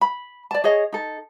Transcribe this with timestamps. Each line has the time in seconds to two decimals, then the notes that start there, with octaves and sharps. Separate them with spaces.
0.01 B5
0.51 D5 A5
0.64 G#4 C#5 D#5
0.92 D#4 A4